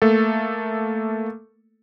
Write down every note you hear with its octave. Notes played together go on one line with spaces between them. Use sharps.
A3 A#3 A4